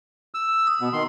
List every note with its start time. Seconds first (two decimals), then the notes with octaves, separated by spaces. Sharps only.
0.34 E6
0.67 D#6
0.81 B2 B3
0.93 D#3 C6